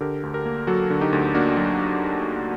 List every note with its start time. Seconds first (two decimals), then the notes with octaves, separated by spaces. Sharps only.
0.01 D3 G4 A#4
0.23 D2
0.34 G4 A#4
0.46 A#3
0.67 F#3 F#4 A4
0.90 D3
1.01 D#4 G4
1.13 D2
1.35 A#3 D4 F#4
1.57 F#3